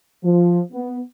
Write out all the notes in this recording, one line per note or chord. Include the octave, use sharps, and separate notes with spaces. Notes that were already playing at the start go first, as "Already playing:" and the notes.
F3
B3